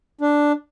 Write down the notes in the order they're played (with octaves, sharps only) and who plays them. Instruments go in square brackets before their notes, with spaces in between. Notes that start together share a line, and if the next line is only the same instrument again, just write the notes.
[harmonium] D4